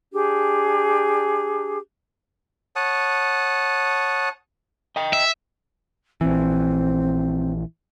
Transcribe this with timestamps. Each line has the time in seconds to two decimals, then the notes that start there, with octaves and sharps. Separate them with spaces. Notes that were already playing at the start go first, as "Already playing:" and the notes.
0.12 D4 G4 G#4
2.76 C#5 F#5 A5 D#6
4.96 D#5 G5
5.13 E5
6.21 A#1 E3 C4